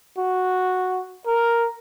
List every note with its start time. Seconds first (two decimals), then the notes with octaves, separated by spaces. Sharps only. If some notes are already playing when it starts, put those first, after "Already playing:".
0.18 F#4
1.27 A#4